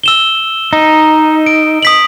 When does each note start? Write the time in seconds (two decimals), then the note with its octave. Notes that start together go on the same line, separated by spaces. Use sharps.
0.03 E6 E7 G7
0.73 D#4
1.46 D7
1.83 D#6 B6 F#7